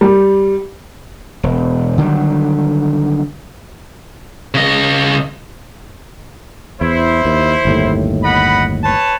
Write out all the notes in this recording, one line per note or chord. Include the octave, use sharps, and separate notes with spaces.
G3
E1
D3 D#3 F#3 G3
C#3 D#5
E2 E4 C5
D#2
G1 D#2 A2
D#5 F#5 B5
B4 C#5 A5